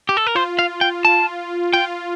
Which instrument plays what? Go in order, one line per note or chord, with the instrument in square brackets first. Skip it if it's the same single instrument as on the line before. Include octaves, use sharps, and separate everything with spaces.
[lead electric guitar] G4
A4
A#4
[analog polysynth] F4 [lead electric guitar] C5
[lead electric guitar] F5
G5
A5
[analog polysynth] F4 [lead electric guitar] G5